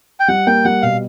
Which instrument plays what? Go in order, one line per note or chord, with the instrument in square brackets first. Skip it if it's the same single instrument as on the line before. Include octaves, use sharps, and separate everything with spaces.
[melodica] G5
[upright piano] G3 [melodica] F#5
[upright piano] A#3 [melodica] G5
[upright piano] G3 [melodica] F#5
[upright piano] B2 [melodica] F5